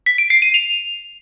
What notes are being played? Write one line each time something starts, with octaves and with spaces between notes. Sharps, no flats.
B6
D7
C7
D#7
F7